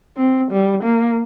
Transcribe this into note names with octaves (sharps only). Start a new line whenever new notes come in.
C4
G3
A#3